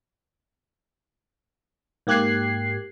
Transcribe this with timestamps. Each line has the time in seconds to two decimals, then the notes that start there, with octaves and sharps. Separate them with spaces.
2.07 G#2 A#3 G4 F#6 G#6 C7